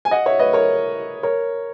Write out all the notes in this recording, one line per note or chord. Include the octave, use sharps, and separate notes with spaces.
G#5
D#5 F#5
C#5 E5
B4 D#5
A#4 C#5
A#4 C#5